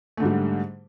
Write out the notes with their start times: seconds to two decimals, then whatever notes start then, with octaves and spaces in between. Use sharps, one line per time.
0.17 A3
0.20 D3
0.23 G#2
0.25 G3